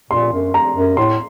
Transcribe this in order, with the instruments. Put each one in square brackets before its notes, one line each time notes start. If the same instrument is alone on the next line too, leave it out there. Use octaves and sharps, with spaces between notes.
[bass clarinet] A#2 [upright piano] C6
[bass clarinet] F#2
[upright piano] A#5
[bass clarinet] F#2
[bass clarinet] A2 [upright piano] C6